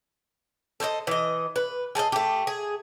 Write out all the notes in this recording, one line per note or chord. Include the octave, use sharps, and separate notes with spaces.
A4 C5 C#5 D#5
E3 D#5
B4
G#4 A4 C5 D#5
A3 G4
G#4